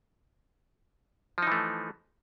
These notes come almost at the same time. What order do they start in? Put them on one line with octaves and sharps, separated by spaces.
F3 D#4 E3 A3